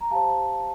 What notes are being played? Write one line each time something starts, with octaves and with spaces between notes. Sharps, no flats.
A#5
G4 C5 F5 A5